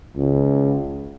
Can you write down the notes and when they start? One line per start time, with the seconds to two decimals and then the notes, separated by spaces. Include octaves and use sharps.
0.16 C#2